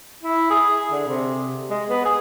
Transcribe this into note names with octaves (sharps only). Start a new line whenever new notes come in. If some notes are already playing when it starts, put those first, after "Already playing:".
E4
G#4
D3
C3
G#3
B3
G#4